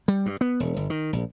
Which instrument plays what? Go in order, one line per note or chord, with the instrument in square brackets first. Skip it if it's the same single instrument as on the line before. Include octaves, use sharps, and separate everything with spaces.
[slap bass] G3
G2
B3
E1
G1
D#3
A#1